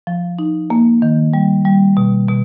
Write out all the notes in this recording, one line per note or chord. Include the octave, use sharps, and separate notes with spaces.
F3
D#4
A#3
D#3
G3
G3
B2
B2